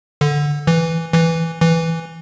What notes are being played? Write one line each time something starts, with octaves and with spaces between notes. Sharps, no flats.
D3
E3
E3
E3